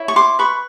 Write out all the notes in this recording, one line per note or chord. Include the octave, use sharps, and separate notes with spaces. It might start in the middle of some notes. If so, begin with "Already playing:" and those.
Already playing: E4 C#5
C#6
C6 D6
B4 B5 C#6